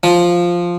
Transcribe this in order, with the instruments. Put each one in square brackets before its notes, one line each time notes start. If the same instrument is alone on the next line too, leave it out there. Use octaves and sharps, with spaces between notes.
[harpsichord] F3